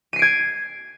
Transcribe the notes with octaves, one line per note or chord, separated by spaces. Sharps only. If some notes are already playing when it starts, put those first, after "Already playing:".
G#6 C7 D7 D#7